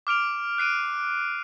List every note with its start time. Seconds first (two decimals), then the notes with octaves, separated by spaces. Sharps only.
0.07 D6 F6 D7 F7
0.58 F#6 C7 D7 D#7